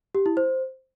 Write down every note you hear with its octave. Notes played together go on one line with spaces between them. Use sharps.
G4
E4
C5